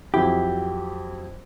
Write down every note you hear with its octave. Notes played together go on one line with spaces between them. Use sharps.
F2 F#3 E4 G4